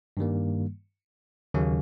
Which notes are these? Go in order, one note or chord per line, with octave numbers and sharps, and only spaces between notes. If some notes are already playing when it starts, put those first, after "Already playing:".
G2 D#3 G3 A#3
D#2 C#3 F#3 A#3 C#4